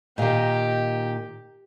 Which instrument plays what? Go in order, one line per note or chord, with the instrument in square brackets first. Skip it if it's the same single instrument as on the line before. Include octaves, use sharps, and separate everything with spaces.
[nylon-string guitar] A#2 D#3 [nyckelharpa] G4 [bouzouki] D#5 F5